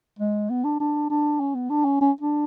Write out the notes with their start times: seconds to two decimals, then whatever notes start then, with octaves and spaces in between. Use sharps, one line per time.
0.19 G#3
0.50 B3
0.64 D4
0.80 D4
1.10 D4
1.40 C#4
1.55 B3
1.70 D4
1.85 C#4
2.01 C#4
2.21 D4